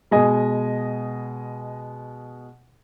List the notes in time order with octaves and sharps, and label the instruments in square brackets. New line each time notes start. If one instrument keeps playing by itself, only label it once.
[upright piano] B2 G#3 D#5 G#5